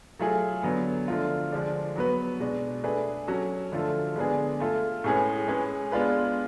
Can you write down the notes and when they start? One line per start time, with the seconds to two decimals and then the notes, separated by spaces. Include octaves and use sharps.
0.19 F#3 A3 F4 G#4
0.63 D3 F#3 B3
1.08 D3 F3 A3 F4
1.52 D3 F3 G#3 D4
1.96 F#3 B3 F#4 B4
2.40 B2 G#3 D4
2.84 A3 D4 G#4 B4
3.27 F#3 C#4 F#4 A4
3.72 D3 F3 A3 F4 A4
4.16 D3 G#3 B3 D4 G#4
4.60 A3 F4 A4
5.04 A2 G#3 C#4 G#4 B4
5.48 G#3 C#4 G#4 B4
5.92 G#3 B3 D4 F4 B4